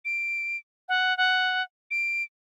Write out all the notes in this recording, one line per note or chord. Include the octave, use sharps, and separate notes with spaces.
D7
F#5
F#5
D7